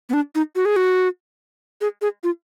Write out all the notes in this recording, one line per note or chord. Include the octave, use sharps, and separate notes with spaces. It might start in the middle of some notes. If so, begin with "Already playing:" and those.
B3
D4
D#4
F#4
G#4
F#4
G#4
G#4
F4